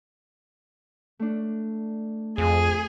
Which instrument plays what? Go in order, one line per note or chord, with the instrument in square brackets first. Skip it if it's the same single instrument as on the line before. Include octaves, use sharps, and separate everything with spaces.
[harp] A3 D4
[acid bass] F2 [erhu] G#4